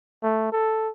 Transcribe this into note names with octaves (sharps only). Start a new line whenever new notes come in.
A3
A4